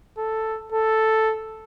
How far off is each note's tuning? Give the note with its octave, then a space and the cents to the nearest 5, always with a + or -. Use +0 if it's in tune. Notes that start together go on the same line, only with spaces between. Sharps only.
A4 +5
A4 +0